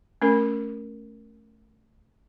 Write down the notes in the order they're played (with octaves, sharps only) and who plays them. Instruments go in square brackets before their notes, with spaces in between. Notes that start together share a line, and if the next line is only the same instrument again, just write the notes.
[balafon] A3 C#4 A#4